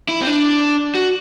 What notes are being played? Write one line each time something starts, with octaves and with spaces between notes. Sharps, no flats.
E4
C4
D4
F#4